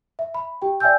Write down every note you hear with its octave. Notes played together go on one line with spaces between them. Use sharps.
E5
B5
G4 G5
D5 E5 G5 G#5 E6 G6